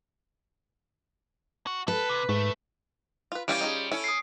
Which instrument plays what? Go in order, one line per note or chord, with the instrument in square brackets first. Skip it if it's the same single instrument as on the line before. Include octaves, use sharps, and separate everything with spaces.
[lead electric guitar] F#4
[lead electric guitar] A4 [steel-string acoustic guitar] B4
[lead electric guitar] C3
[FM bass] G#2 [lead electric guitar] A3
[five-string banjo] F4 B4
[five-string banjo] E3 G4 F5 [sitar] G3 C#4 [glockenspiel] D7
[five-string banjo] D#4 F4 G#4
[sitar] C#4 [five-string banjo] E4 A4
[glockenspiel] D#6 C7